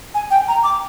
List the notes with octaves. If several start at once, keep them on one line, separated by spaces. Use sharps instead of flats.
G#5
G5
A#5
D6